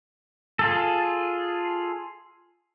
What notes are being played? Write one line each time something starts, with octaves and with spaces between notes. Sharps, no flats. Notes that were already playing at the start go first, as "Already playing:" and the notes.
F4 G#4 A4